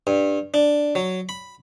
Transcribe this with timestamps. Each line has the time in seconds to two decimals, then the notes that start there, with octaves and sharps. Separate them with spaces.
0.07 G2
0.54 D4
0.95 F#3
1.29 B5